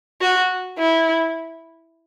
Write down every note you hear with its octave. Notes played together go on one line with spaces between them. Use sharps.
F#4
E4